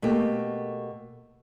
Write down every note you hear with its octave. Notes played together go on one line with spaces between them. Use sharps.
B2 A3 A#3 G4